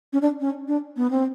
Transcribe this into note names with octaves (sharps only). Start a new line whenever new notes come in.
C#4
D4
C#4
D4
B3
C4